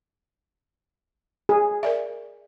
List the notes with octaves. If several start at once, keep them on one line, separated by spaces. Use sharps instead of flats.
G#4
A#4 D5 E5